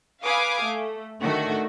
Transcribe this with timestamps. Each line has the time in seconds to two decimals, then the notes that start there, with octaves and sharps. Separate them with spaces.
0.24 B4 F5 G#5 D6 D#6
0.63 A3
1.22 D3 D#3 A3 F#4